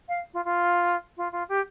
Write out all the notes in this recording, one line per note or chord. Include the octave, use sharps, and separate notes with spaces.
F5
F4
F4
F4
F4
G4